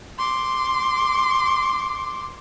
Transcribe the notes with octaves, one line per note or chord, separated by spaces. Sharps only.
C6 D6